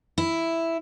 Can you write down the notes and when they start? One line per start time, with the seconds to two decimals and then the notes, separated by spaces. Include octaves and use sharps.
0.18 E4